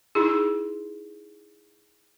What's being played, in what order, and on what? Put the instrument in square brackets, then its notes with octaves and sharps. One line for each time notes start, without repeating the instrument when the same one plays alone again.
[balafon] D#4 E4 G#4